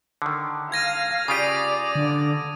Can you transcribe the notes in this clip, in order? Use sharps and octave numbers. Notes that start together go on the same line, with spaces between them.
D3 D#3
F5 G#6 A#6 D#7
C#3 F4 G4 D5 D#6 D#7
D3